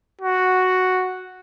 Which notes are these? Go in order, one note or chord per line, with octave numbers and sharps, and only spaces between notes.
F#4